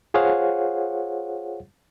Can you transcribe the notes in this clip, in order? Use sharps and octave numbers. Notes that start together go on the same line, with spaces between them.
F4 G#4 C5 C#5 F5 F#5